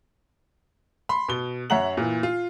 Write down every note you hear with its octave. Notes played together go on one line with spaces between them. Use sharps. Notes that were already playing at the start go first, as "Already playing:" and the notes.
B5 C6
B2 G7
F#2 C#5 E5 F#5 A#5 F#7
A#2 E3
F4